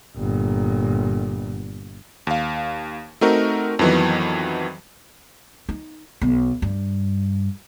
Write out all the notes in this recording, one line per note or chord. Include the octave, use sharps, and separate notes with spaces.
G1 A#2
D#2 F5
A3 C4 D#4 F#4 A#4
F2 D#3 E3 F#3 B3
D#4
B1
G2